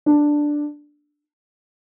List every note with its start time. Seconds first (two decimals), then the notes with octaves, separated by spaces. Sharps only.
0.06 D4